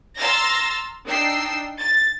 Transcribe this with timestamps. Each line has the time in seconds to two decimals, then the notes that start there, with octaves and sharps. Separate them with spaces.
0.17 A#5 C6 E6 F6 A6 A#6
1.06 D4 D#4 G5 E6 C7
1.79 A6